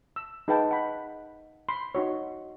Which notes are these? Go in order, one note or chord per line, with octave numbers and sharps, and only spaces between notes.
E6
D#4 G#4 B4 F5 G5 A5
F#5 B5
B5 C6
D#4 F#4 C#5